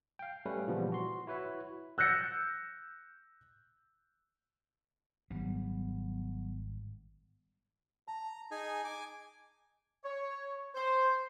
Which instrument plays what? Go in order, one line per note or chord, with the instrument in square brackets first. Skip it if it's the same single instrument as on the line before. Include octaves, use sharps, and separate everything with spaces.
[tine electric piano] F5 G5
G3 A3 C#4 B4
A#2 C#3 E3 F3 G3 B3
F#4 C6
E4 F#4 B4 C#5 E5
[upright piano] E6 F#6 G6 A6 A#6 C#7
[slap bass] G#1 G3 [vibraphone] F#3 B3
[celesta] A5 [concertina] A#5
[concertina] D#4 G#4 G#5
G#5 D6
[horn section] C#5
C5